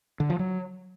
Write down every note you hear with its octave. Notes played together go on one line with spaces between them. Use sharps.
D3
F3
F#3